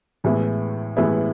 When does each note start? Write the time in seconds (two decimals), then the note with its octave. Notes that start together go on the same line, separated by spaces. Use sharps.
0.24 A1 A2 G#3 B3 E4
0.96 A1 A2 G#3 B3 E4